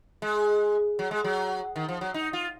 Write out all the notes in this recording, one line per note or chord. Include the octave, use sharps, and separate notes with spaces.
G#3
F#3
G#3
F#3
D#3
F3
F#3
D#4
F4